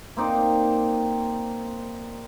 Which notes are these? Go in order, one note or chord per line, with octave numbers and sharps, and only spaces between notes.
A#3 C4 D#4 D5